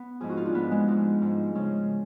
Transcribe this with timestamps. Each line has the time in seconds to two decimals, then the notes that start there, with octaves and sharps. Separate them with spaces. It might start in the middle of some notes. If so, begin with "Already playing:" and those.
Already playing: B3
0.20 G#2 F3 G#4
0.29 F#4
0.37 F4
0.46 D4
0.54 G#2 F3 B3
0.71 G#3
0.88 G#2 F3
1.21 G#2 F3
1.55 C#3 F3 G#3